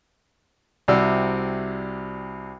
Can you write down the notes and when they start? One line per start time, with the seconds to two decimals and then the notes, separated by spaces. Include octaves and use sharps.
0.88 C2 C3 F#4 D5 E6